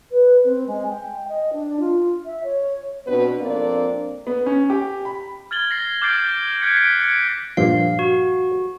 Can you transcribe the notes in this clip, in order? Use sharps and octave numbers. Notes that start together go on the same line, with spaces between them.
B4
C4
G#3
G5
D#5
D4
F4
E5
C#5
B2 B3 C4 D4 B4
F2 A#3 C4 D4 D5
B3
C#4
G4
B5
F6 G#6 A6 F#7 G7
A#6 C7
D6 F6 G6 A6 C7 D7
F#6 G#6 B6 C#7 D7
F#6 G#6 A6 B6 C7 D7
G#6 C#7
G2 A#2 F3 F5
F#4